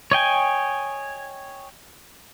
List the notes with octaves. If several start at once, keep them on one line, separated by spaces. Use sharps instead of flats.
C#5 D#5 G5 G#5